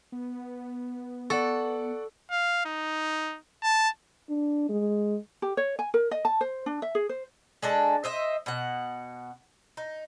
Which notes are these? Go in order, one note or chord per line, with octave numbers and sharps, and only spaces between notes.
B3
A4 D5 F#5 C#6
F5
D#4
A5
D4
G#3
G4
C#5
G#5
A#4
D#5
A5
C5
D4
E5
G#4
C5
G#3 D4 A4
C5 D#5 E5
B2 F#5
D#4